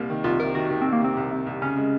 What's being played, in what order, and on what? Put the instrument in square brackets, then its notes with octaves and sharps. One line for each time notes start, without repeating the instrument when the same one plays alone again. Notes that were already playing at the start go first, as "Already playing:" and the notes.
Already playing: [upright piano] C2 A#3
D#3
[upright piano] C2 [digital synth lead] F4
[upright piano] C3 [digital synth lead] A#4
[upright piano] D#3 [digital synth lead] F#4
[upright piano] D#3
[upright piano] C2 [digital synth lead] C4
[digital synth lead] A#3
[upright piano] C3 [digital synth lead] C4
[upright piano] C2
C3
C2
[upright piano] C#3 [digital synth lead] C#4
[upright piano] G#3